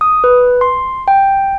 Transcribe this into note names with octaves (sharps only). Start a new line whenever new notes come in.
D#6
B4
C6
G5